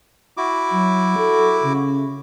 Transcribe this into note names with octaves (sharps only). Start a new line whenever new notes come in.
E4 F#4 D6
F#3
A4
C#3